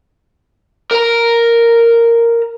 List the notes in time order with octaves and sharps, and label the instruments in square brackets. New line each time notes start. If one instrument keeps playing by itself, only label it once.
[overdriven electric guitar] A#4 A#5